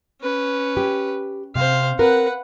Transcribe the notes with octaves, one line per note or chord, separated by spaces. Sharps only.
C#4 B4
G4
C3 C5 F5
C4 A#4 B4 F#5